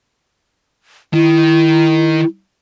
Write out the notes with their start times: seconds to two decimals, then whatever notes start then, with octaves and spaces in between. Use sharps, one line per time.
1.13 D#3 E4